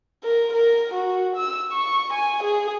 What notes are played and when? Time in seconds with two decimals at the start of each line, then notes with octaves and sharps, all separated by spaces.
0.24 A#4
0.53 A#4
0.94 F#4
1.36 E6
1.72 C#6
2.13 G#5
2.43 G#4